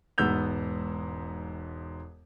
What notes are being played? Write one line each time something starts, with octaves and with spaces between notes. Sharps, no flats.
E1 G#2 B3 E6 G6 F7